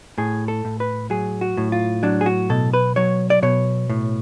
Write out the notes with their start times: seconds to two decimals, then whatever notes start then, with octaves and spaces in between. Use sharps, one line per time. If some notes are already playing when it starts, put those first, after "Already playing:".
0.18 A2 G#4
0.48 A4
0.65 A2
0.80 B4
1.10 F#3 G#4
1.41 F#4
1.57 A2
1.72 F4
2.03 F#3 D4
2.21 G#4
2.26 F#4
2.50 B2 A4
2.74 B4
2.96 F#3 C#5
3.30 D5
3.43 B2 C#5
3.90 A2